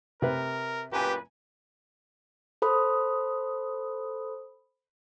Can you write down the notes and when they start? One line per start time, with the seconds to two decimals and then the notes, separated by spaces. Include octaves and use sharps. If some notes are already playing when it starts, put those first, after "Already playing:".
0.22 C3 A#4 B4
0.92 F#2 A#2 G4 B4 G#5 A#5
2.62 A4 C5 B5 D#6